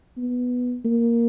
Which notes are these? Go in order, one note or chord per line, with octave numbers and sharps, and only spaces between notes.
B3
A#3